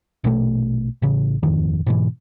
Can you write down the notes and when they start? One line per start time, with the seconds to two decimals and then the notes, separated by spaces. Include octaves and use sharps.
0.24 A#1 B2 F3 A3
1.02 A1 C#3
1.43 D#1 G#1 F2 D#3
1.87 G#2 B2 E3